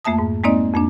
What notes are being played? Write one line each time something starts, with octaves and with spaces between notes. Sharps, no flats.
F2 A3 A#3 E5 A5 D#6
G#2
G#3 A#3 C4 D#4 D5 D#5
F2 A#3 D4